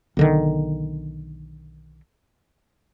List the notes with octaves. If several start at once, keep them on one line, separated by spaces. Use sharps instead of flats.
B1 D3 D#3